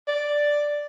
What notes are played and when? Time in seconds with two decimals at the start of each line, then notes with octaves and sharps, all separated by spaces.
0.08 D5